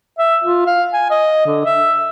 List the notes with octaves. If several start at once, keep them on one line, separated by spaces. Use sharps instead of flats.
E5
F4
F5
G#5
D#5
D3
E5